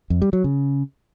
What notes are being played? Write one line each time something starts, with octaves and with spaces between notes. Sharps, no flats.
F2
G3
F#3
C#3